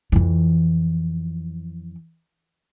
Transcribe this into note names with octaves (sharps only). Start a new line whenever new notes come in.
F2 E3